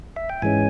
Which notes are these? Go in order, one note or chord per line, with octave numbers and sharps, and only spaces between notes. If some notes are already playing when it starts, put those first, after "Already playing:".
E5
G5
G#2 E3 G#3 C#4 G#5